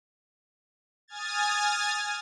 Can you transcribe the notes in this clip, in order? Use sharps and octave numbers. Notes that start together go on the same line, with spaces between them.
G#5 D#6 F6 G#6 A6